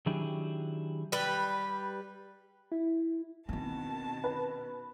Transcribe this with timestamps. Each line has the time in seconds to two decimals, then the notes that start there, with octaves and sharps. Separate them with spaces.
0.06 D#3 F#3 D4 E4 G4 G#4
1.12 G3 B4
2.72 E4
3.49 B2 D#3 C4 C#4 A5
4.24 B4